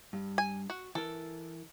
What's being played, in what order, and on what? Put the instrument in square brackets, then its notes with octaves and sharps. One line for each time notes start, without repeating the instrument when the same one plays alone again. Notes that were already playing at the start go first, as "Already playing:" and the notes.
[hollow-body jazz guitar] G2
[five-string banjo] G#5
F#4
[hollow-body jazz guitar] E3 A#4 [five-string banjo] A4